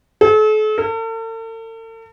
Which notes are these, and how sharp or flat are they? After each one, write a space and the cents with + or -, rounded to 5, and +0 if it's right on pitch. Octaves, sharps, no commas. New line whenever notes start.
A4 -40
A4 +45